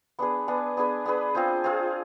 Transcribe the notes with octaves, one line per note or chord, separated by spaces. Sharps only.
B3 D4 G#4 B4
B3 D4 G#4 B4
B3 D4 G#4 B4
B3 D4 G#4 B4
C4 F4 G#4 C5
C4 F4 G#4 C5